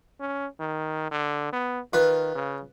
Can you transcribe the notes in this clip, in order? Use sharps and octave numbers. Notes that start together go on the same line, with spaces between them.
C#4
D#3
D3
B3
D#3 F4 B4
C#3